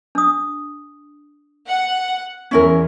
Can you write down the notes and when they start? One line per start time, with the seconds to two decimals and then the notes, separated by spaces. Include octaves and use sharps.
0.15 D4 D#6
1.67 F#5
2.51 E2 C#4 E4 A#4